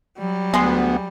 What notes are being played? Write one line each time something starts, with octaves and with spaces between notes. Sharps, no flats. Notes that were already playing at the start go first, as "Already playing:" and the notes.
F#3 G3
D2 G#3 B3 G#4 C6